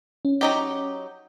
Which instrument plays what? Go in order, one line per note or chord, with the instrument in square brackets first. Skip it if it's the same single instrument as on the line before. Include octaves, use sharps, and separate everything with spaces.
[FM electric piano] C#4
[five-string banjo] F#3 D#4 G4